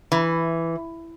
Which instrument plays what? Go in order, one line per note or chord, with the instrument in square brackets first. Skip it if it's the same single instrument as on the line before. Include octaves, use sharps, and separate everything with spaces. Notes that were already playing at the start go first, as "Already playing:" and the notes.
[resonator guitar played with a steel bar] E3